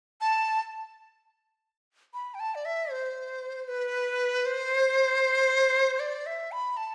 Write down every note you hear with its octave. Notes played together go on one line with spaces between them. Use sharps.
A5
B5
G5
A5
D5
E5
C5
B4
C5
D5
E5
B5
A5